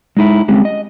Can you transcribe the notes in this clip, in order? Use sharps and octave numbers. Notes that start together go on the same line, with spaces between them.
G#3 D#4 E4
G3 G#3 C4 C#4
D#5